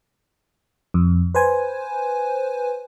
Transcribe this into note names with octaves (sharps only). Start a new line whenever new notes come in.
F2
B4 C5 G#5